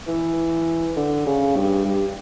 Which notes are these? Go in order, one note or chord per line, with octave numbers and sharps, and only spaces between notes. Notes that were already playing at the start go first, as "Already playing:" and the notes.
E3
D3
C#3
G2
G2